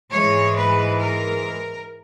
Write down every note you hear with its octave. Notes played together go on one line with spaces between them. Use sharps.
G#2 E3 G#3 C#5
B4
A#4